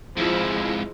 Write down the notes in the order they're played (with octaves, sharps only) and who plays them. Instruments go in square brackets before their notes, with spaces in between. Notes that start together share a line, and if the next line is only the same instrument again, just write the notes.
[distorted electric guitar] F2 G#2 [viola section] F3 G#3 E4